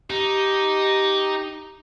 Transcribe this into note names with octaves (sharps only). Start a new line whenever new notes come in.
D#4 G4